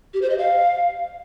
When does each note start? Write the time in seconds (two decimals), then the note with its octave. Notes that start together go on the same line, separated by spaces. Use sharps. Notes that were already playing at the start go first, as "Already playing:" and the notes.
0.14 G4
0.22 C5
0.30 D#5
0.38 F5